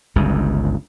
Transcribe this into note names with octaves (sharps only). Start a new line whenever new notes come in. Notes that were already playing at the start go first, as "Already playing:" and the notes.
G1 C#2 G2